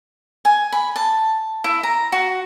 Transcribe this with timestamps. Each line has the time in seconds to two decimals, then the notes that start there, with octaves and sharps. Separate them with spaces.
0.45 G#5
0.72 B5
0.96 A5
1.64 E4
1.83 A#5
2.12 F#4